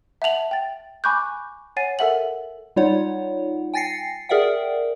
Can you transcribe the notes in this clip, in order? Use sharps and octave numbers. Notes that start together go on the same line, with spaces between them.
E5 F#5 A5 F7 F#7
G5 A6
G#5 B5 C#6 D6 F#6 G6
C#5 F#5 G#5 A6 C7 D#7
A4 A#4 E5 F#5 F#7
G3 D#4 F4 C#5 F#5
G5 G#5 A6 A#6 C7 C#7
G#4 A#4 D5 E5 F#5 G5